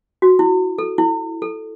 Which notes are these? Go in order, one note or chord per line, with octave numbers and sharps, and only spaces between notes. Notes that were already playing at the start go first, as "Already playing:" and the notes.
F#4
E4
A4
E4
A4